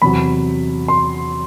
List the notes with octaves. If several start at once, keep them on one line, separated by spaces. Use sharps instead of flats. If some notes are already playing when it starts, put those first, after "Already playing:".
E2 C3 F#3 B5
C6